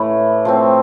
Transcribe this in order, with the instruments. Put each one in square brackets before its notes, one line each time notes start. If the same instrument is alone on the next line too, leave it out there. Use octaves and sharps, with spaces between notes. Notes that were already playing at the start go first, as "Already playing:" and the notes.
Already playing: [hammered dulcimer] A2 E3 A3
F3 A3 C4